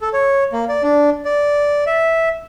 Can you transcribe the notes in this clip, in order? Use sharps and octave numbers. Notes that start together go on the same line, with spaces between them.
A4
C#5
A#3
D5
D4
D5
E5